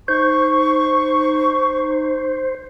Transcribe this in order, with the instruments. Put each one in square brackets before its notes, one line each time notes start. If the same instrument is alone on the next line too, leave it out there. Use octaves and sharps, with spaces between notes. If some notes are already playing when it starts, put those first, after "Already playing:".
[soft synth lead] D#4 [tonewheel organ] C5 [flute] C#6